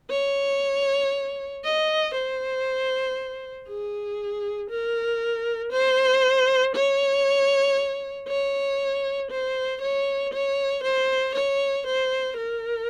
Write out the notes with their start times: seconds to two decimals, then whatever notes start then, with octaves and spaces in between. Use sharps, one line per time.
0.10 C#5
1.64 D#5
2.14 C5
3.68 G#4
4.70 A#4
5.72 C5
6.75 C#5
8.28 C#5
9.31 C5
9.81 C#5
10.34 C#5
10.84 C5
11.35 C#5
11.87 C5
12.37 A#4